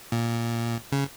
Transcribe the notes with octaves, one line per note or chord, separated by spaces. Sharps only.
A#2
C#3